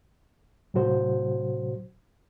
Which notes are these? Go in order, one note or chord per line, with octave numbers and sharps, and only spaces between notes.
A2 C3 F#3 F#4 C5